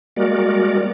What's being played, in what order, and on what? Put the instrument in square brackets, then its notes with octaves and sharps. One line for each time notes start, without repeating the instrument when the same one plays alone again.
[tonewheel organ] G3 G#3 A#3 F#4 A#4 D5